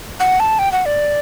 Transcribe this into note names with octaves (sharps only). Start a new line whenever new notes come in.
F#5
A5
G5
F#5
D5